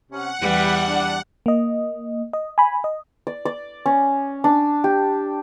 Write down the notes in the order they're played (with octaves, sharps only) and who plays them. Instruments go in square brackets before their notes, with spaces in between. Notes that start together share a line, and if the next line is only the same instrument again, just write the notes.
[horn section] C3 C#4 [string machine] F#5
[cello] E2 E3 [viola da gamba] G3 [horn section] G4 B4
[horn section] D4
[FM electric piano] A#3 D#5
D#5
G#5 B5
D#5
[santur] D5
D5
C#4
D4
G4